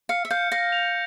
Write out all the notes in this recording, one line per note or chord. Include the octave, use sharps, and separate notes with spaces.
F5 C#7
E5
F5 G6
F5 A#6
F7